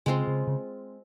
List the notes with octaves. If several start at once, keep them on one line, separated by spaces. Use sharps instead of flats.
C#3 G#3 C4 F4
C#3
C#3